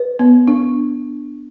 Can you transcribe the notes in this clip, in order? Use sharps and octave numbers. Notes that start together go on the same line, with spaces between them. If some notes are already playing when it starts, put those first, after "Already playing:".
Already playing: B4
B3
D4